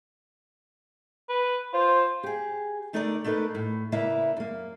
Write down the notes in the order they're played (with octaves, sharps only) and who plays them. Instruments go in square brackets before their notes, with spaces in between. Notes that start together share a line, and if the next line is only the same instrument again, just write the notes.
[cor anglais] B4
[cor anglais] F4 [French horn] C5
[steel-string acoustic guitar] G4 G#4
D3 A3 D#4 A#4 B4 D5
A3 A#3 D#4 A4 B4
A2
C#3 A#3 E4 B4 D5 E5
F#2 A#3